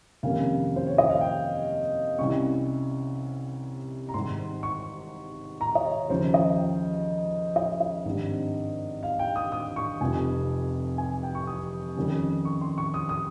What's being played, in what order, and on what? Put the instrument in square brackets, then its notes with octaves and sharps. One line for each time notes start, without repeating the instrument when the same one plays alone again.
[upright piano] F2 C3 D#3 A#3 C#4 F5
C5
C#5
D#5
F5
G5
C2 C3 G3 C#4 C#6
A#5
G#1 G#2 G3 C6
C#6
A#5
D#5
C#5
D#2 C#3 F3 C5
D#5
G5
D#5
D#5
G#1 G2 G3 C4
F5
G5
D#6
D#6
C#6
F1 F2 C3 F3 G#5
G#5
G5
C#6
D#6
F2 D#3 G3 C#4
C#6
C6
C#6
D#6
D#6